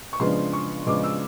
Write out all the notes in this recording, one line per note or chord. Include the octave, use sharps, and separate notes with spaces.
C#6
C#3 F3 G#3 B3 D4 C6
C#6
C#3 F3 G#3 B3 D4 D6
E6